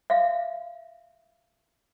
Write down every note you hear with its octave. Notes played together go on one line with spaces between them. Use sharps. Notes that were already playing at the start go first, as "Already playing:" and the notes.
E5 F5